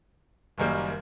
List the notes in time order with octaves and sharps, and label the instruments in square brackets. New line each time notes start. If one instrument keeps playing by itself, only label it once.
[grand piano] F#1 F#2 D#3 G3 A#3